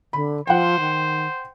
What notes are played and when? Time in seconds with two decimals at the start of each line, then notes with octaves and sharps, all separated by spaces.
0.13 D3 B5
0.47 F3 C5 F#5 G5
0.80 D#3